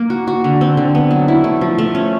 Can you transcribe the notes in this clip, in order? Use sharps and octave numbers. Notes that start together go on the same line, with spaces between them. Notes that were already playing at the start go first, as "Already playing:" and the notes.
Already playing: A#3
F#4
F#4
D3
C4
D3
B3
F#3
E4
A3
F3
A3
C#4